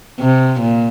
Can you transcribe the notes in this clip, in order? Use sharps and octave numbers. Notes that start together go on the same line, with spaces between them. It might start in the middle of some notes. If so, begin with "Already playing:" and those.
C3
A#2